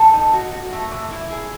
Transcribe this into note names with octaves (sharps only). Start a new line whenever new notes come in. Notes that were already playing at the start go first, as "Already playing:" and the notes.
Already playing: A4
D#4
F#4
F#4
A3
E3
E4
G#4